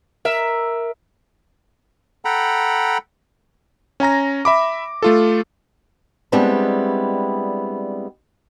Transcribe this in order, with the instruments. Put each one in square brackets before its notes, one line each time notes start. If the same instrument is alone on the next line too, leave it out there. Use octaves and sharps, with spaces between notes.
[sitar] A#4 E5
[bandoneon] A4 F#5 G5 A#5 B5
[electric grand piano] C#4 G#5 A#5 A#6
E5 B5 D6
A3 F4 A4
[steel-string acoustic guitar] G3 G#3 B3 C4 D4 E4